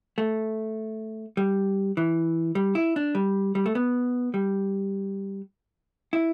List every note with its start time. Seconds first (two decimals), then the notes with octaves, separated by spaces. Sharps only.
0.18 A3
1.37 G3
1.97 E3
2.55 G3
2.75 E4
2.96 D4
3.15 G3
3.55 G3
3.66 A3
3.75 B3
4.34 G3
6.13 E4